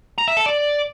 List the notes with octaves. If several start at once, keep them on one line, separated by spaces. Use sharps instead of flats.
A#5
E5
A4
D5